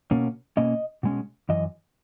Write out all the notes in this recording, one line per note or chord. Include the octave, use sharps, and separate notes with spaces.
B2 A#3 C#4
B2 A#3 C#4 D#5
B2 G#3 C#4
F#2 E3 D#5